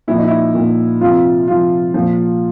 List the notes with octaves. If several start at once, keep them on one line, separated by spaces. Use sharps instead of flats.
A#2 F3 E4
D#4
E4
A#2 F3
C3 F3 F4
C3 F3 F4
A#2 F3